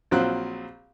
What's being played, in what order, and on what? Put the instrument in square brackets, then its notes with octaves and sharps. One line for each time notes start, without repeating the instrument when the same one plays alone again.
[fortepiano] A#1 F#3 C4 F4 F#6